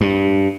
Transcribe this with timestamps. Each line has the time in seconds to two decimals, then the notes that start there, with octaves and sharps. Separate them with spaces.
0.01 G2